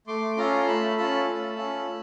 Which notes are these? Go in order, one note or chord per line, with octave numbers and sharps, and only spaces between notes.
A3 C6 D6
C#4 F4 A4 A#5 C6
A3 A5 B5
C#4 F4 A4 A5 B5
A3
C#4 F4 A4
A3